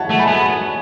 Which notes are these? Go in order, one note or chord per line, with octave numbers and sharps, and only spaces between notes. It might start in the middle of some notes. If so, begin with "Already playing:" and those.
Already playing: C#5 D#5 E5 F#5 A5
A3
G#5 B5
B3